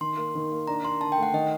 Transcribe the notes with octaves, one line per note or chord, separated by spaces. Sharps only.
D#3 C6
A#3
D#3
A#3
D4 A#5
D4 C6
D3 A5
G5
A3 F#5
D#3 D#5